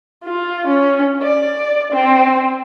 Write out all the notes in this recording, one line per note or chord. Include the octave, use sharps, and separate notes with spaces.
F4
C#4
D5
C4